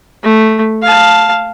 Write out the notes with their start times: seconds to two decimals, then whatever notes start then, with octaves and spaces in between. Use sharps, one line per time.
0.23 A3
0.82 F5 A5